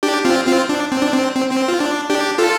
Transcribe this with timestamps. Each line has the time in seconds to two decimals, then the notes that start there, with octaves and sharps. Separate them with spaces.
0.03 D4 G4
0.25 C4 F4
0.47 C4 F4
0.69 D4
0.92 C4
1.02 D4
1.13 C4
1.36 C4
1.51 C4
1.68 F4
1.80 D4
2.10 D4 G4
2.38 F4 A4